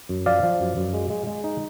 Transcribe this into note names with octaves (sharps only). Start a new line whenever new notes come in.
F#2
F3 D5 F5
F3
F#2
F#2
G#3
G#3
G#3
D#4